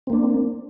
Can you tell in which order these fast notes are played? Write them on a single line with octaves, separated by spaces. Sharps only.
C4 A#3 D4